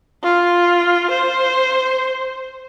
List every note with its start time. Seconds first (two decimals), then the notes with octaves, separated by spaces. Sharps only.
0.23 F4
1.10 C5